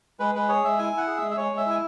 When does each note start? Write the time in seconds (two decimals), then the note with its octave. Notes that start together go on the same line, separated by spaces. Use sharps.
0.20 G#3 B4
0.35 G#3 B4
0.49 G#4 C#5
0.64 G#3 E5
0.79 E4 G#5
0.93 E4 F#5
1.07 G#4
1.17 G#3 E5
1.31 E5
1.37 G#3 C#5
1.52 G#3
1.57 E5
1.66 E4 G#5